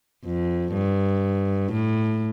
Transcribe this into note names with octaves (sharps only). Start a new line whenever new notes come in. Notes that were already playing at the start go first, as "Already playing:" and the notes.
F2
G2
A2